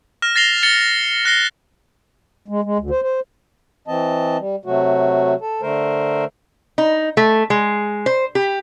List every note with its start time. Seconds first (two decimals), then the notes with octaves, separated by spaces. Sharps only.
0.22 F6 A#6 E7
0.36 A6 A#6 C7 F7 G7
0.63 A6 C#7 G7
1.25 F#6 A#6 C7 G7
2.48 G#3
2.64 G#3
2.78 D2
2.91 C5
3.02 C5
3.88 E3 C4 D#5 A5
4.38 G3
4.65 C3 F#3 A3 F#4
5.41 A4
5.62 D3 A3 A#4 C5
6.78 D#4
7.17 A3
7.50 G#3
8.06 C5
8.35 G4